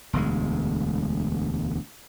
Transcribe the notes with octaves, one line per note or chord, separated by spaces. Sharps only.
E1 D2 G#3